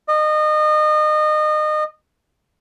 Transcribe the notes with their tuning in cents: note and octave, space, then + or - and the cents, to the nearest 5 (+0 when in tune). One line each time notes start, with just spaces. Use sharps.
D#5 -30